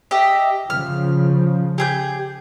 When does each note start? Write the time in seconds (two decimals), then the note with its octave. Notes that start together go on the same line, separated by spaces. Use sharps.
0.11 G4 D#5 E5
0.70 C#3 F3 F6
1.78 G4 G#4 G6